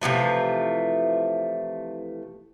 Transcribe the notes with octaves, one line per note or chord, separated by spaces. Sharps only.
C3 E3 F3 A3